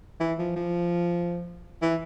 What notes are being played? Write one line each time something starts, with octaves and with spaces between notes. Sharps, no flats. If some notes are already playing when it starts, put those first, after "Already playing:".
E3
F3
F3
E3